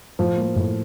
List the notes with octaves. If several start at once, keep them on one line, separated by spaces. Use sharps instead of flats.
A2 F3 F4
F3 A#3
A2